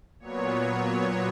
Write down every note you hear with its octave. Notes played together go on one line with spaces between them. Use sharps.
A#2 F#3 B3 C#5